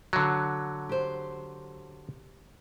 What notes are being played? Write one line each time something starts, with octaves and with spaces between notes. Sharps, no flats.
D3 F#3
G4 C5